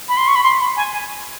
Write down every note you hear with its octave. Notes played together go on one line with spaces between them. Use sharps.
B5
C6
C#6
B5
C6
B5
G#5
G#5